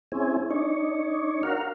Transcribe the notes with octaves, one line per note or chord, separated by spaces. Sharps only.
C4 C#4 E4 G#4
D4 D#4 C#5
F#4 A#4 F5